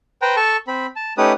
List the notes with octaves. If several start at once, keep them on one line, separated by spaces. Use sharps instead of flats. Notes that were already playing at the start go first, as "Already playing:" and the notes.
B4 C5 G5 A#5
A4 A5 C#6
C4 B5
A5
A3 C#4 D#4 G4 B4 D#6